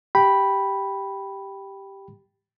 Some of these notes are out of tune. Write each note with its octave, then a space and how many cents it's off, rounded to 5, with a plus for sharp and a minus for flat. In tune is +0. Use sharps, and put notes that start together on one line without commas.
G4 +0 G5 +0 B5 -5